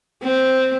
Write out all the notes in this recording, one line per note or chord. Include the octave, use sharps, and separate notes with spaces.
C4